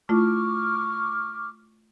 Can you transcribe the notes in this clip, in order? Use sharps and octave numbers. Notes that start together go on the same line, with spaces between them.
A3 E4 F4 C#6 D6 F6